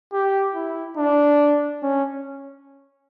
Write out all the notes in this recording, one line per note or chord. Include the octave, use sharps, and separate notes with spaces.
G4
E4
D4
C#4